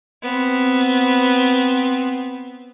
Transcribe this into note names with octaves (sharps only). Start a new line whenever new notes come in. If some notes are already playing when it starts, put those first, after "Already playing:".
B3 C4